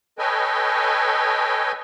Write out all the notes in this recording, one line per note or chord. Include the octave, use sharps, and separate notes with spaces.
A4 B4 C#5 D#5 G5 G#5